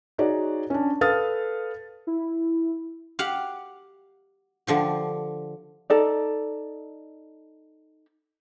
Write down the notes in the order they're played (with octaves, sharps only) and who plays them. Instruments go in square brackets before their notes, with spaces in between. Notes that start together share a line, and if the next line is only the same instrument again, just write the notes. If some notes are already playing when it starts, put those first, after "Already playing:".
[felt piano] D#4 F#4 G#4 C#5 D5
C#4 D4
A4 B4 F5 D#6 F6 A6
[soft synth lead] E4
[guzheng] G4 F5 F#5
D3 F3 G4
[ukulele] D#4 A4 D5